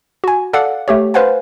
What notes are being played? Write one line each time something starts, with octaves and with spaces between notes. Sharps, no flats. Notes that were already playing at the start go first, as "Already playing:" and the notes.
F#4 G#5
A4 D5 F5 F#5
A3 G4 C#5
B4 C5 F5 F#5 G#5